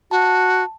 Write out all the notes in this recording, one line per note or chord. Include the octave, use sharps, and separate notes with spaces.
F#4 A5
A5